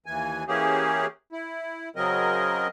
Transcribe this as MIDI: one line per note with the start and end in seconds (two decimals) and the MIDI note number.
0.06 0.44 39
0.06 0.44 52
0.06 0.44 80
0.48 1.06 52
0.48 1.06 58
0.48 1.06 61
0.48 1.06 67
0.48 1.06 68
1.32 1.89 64
1.96 2.67 49
1.96 2.67 54
1.96 2.67 60
1.96 2.67 70
1.96 2.67 75